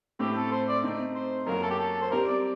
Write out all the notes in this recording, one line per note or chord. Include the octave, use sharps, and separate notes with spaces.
A2 A3 C4 G4
A4
C5
D5
A3 C4 D#4
C5
F#2 F#3 A#3 F#4 A#4
A4
G4
A4
C5
G3 C4 G4 A#4
D5